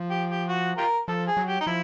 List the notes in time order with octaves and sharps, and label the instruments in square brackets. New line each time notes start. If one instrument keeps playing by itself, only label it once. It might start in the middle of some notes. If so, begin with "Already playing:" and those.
Already playing: [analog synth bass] F3
[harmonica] G4
G4
F#4
F4 G4 A#4
[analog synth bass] F3 [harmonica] A4
[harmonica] G#4
[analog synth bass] F#3
[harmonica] G4
D#4
[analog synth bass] F3 [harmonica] E4